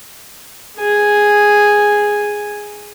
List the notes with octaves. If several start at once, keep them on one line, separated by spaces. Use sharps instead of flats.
G#4 G#5